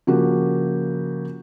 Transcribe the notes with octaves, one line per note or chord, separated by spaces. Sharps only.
C#3 F3 A#3 F#4 G4